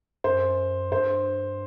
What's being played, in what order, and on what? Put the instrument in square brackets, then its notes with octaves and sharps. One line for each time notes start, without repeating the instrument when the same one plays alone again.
[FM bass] F#2 [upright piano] C5
[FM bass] G2 [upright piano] C5